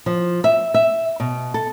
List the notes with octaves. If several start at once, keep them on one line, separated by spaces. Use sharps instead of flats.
F3
E5
E5
B2
A4